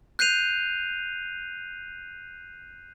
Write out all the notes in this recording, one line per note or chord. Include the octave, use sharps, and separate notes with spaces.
F#6 G6 C7 D#7 F7